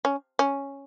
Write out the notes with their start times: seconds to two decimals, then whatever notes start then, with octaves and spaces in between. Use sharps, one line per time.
0.05 C#4
0.39 C#4